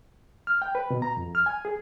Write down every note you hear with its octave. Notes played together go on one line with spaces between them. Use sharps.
F6
G5
B4
B2
A#5
F2
F6
G#5
G#4